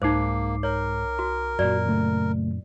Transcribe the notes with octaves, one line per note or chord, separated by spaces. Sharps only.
C2 G#2 A#3 D#4 C5 D6 C7
A#4 C#5
F#4
F#2 A#2 F#4 D5
C#3 A3